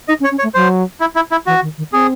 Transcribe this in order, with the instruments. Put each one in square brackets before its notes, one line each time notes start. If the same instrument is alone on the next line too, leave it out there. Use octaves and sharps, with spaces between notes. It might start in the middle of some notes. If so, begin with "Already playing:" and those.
[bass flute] D#4 [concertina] D#5
[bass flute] C#4
[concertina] C#5
[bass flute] C#4
[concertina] C#5
[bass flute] A3
[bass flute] F#3 [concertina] C5
[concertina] E4
E4
E4
[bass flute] E3 [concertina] F#4
[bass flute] D#3
D#3
[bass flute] C4 [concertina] G#4